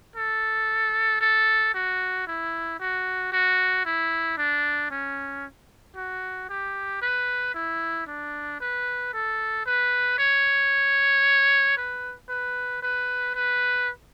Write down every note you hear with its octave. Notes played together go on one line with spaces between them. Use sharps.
A4
A4
F#4
E4
F#4
F#4
E4
D4
C#4
F#4
G4
B4
E4
D4
B4
A4
B4
C#5
B4
B4
B4
B4